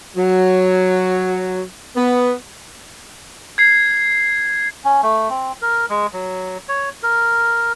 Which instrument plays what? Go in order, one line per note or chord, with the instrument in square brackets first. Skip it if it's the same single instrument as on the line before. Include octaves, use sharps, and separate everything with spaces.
[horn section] F#3
B3
[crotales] G#6 C7
[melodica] C#4
A3
C4
A#4
G#3
F#3
C#5
A#4